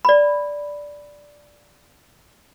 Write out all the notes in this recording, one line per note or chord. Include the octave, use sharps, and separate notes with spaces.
D5 B5